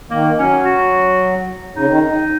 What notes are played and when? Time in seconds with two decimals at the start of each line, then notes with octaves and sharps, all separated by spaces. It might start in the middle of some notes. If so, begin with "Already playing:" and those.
0.11 D#3 A#3
0.38 F#3 C#4
0.65 F#4
1.76 C#3 D#4
1.89 D#3